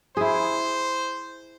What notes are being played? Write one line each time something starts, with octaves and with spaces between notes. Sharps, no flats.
E4 G#4 C5